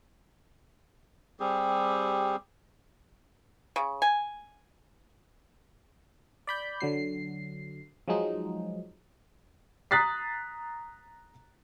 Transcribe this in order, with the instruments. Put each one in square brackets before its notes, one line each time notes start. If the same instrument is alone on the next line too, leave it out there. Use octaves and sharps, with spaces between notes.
[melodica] G3 C4 G4 G#4
[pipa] C#3
G#5
[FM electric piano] D5 B5 G6
D3 F#3 C7
F3 F#3 G#3 D#4
[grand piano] A#5 D#6 F#6 A6 B6 C7